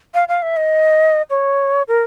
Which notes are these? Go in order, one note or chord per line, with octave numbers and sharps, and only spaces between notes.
F5
F5
E5
D#5
C#5
A#4